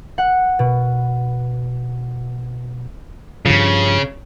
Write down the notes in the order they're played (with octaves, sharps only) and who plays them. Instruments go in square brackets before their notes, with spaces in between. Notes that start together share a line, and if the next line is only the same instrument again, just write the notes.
[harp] F#5
B2
[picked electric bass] G2 F3 [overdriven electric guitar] C#3